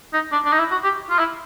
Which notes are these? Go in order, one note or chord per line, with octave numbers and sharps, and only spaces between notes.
D#4
D4
D4
D#4
E4
F#4
G4
F4
E4